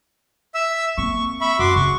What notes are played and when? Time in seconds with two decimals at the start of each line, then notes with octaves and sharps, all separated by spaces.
0.55 E5 E6
0.98 A#3 C4 C#6
1.41 E5 B5 C#6
1.59 F#2 F#4 C6 D6
1.76 C#3 C#6